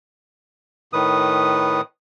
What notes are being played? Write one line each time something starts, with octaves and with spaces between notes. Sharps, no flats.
A2 D#3 B4 D#6